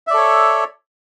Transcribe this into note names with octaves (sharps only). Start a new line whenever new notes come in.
A4 C#5 D5 E5